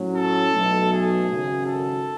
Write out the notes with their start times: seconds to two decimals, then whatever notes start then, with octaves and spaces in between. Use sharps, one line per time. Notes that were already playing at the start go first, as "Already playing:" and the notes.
Already playing: A2 F#3 C#4
0.16 A4
0.53 B1 B2 F#3 A3
0.91 G#4
1.28 G#1 F#2 C#3 F#3
1.67 A4